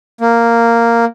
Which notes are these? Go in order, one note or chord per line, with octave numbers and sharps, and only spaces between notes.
A#3